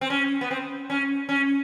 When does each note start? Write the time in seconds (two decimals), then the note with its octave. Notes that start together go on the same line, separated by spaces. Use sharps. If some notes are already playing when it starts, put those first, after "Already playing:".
0.01 C4
0.10 C#4
0.41 B3
0.51 C4
0.90 C#4
1.29 C#4